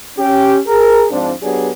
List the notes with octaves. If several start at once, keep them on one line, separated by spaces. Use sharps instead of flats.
C#4 G4
G#4 A#4
G#2 F3 C4 D4
F#3 B3 D4 G4 G#4 D5